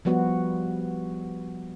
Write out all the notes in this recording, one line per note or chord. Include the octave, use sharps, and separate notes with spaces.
F3 G3 B3 F#4